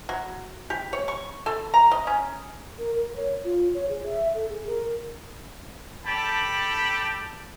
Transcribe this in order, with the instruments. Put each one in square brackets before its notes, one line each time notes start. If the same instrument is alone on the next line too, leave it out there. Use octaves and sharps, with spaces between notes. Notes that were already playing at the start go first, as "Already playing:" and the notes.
[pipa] F#3
G4
C#5
C#6
A4
A#5
D#5
C#4
[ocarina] A#4
A#4
C#5
F4
C#5
G#4
E5
A4
G#4
A#4
[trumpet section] G4 A4 D5 G5 A5 B5